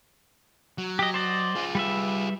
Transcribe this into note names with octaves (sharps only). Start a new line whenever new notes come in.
F#3
G4 D#5
C5 D5 D#5
F4 G#4
G3 B4 E5